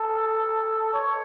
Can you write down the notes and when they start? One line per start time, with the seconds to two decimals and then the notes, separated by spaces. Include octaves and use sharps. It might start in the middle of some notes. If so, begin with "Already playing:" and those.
Already playing: A4
0.94 C#5